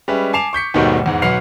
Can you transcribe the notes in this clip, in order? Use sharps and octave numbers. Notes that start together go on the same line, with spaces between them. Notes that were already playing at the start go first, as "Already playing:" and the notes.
G3 G#3 C#4 B4 E5
G#5 A5 D6 C7 E7 F7
C#6 G6 B6 C#7
D#2 G#2 B2 D#3 G3 A3
E2 G#2
B1 B4 F#5 F6 C7 F7